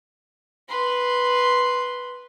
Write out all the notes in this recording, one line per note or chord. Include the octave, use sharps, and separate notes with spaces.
B4 C6